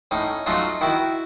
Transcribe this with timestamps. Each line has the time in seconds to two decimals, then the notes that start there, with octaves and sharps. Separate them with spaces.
0.11 A2 C#4 D#4
0.46 F#3 A3 C#4 D#4 F4
0.81 D#3 E4 F#4